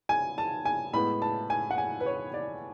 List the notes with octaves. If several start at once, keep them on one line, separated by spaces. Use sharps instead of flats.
G#5
A5
G#5
A2 G#3 B3 B5
A5
G#5
F#5
G#5
B4
C#5
D5